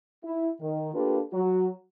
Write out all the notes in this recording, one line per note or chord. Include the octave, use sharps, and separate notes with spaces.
E4
D#3
A#3 D4 F4 G4 A4 B4
F#3 F#4